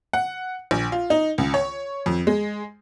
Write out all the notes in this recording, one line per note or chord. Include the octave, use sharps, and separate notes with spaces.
F#5
A#1
F4
D#4
C#2
C#5
F2
G#3